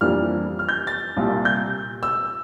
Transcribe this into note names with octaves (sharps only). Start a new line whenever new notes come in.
F2 E3 G3 A#3 D4 F6
F6
G6
A6
C2 A#2 G3
G6
E6